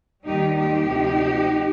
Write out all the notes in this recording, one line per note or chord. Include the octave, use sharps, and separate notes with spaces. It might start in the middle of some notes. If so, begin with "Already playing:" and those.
D#2 D#3 G3 D#4 G4
D#4 G4
D2 C3 F3